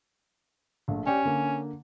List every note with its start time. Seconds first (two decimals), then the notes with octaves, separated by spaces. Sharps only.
0.88 A#1 A3
1.07 C#4 G4 D5 G5
1.25 D3 A#3